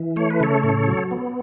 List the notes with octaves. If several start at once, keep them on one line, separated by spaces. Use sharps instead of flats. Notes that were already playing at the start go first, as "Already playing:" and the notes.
Already playing: E3
A3 C#5
B4
C#3 A4 C#5
A2
F#3
B3